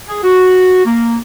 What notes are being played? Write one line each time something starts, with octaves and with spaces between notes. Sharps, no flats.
G#4
F#4
A#3